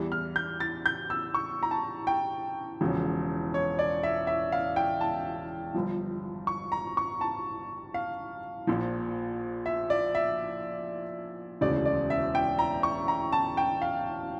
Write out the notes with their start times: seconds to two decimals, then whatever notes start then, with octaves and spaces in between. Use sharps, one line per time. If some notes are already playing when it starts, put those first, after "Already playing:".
Already playing: E2 E3 G3
0.12 F6
0.36 G6
0.60 A6
0.86 G6
1.10 E6
1.34 C#6
1.63 A#5
1.71 A5
2.07 G5
2.81 E1 E2 C#3 F3
3.54 C#5
3.79 D5
4.03 E5
4.27 E5
4.52 F5
4.76 G5
5.01 A5
5.74 G1 G2 F3
6.47 C#6
6.72 A#5
6.97 C#6
7.21 A5
7.94 F5
8.67 A#1 A#2 F3
9.66 E5
9.90 D5
10.15 E5
11.61 E1 D2 C#3 D5
11.86 D5
12.10 E5
12.35 G5
12.59 A#5
12.83 C#6
13.08 A#5
13.32 A5
13.57 G5
13.82 F5